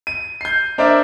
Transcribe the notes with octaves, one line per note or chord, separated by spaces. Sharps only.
D#7
G6 C7
D4 A#4 C5 D5 E5